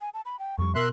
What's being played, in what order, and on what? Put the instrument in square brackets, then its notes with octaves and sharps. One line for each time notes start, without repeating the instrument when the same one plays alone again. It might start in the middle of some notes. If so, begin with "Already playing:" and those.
[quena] G#5
A5
B5
G5
[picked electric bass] F2 G3 [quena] C#6
[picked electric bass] B2 [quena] A#4 [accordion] E5 C6 F#6